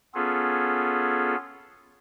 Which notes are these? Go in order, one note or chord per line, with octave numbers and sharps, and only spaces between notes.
B3 C#4 F4 G#4 A4